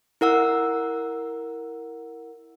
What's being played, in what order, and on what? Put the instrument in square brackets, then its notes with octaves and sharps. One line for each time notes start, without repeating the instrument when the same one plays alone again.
[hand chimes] E4 A#4 F#5 E6